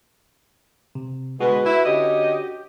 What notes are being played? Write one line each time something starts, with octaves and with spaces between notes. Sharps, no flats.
C3
B2 D3 G#3 F#4 B4
E4
D3 C#4 G4 D#5